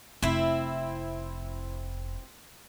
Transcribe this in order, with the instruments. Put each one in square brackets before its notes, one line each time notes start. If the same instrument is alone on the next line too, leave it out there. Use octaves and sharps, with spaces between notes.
[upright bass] F1 [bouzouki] C4 E4